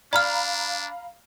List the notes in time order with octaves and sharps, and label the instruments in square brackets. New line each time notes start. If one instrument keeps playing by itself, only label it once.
[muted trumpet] D4 [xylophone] D5 F6 [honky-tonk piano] F5 A#5 B5